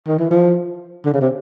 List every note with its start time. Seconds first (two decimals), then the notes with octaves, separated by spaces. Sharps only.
0.07 D#3
0.19 E3
0.31 F3
1.06 D3
1.13 C#3
1.21 C3